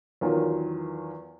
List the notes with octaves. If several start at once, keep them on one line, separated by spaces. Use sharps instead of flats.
E2 D#3 F#3 F4 A#4